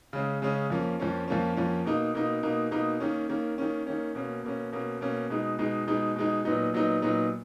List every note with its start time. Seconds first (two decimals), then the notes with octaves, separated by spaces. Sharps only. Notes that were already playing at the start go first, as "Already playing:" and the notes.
0.13 C#3 G#3 C#4
0.42 C#3 G#3 C#4
0.70 F2 F3 A#3 C#4
1.00 F2 F3 A#3 C#4
1.28 F2 F3 A#3 C#4
1.57 F2 F3 A#3 C#4
1.85 B2 A#3 D#4
2.14 B2 A#3 D#4
2.43 B2 A#3 D#4
2.71 B2 A#3 D#4
3.00 D#3 A#3 C#4
3.29 D#3 A#3 C#4
3.58 D#3 A#3 C#4
3.87 D#3 A#3 C#4
4.15 B2 A#3 C#4
4.44 B2 A#3 C#4
4.73 B2 A#3 C#4
5.01 B2 A#3 C#4
5.30 B2 G#3 D#4
5.59 B2 G#3 D#4
5.87 B2 G#3 D#4
6.16 B2 G#3 D#4
6.45 A#2 F#3 B3 D#4
6.74 A#2 F#3 B3 D#4
7.02 A#2 F#3 B3 D#4